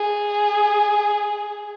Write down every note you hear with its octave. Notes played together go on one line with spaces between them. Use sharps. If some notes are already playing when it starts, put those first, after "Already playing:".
Already playing: G#4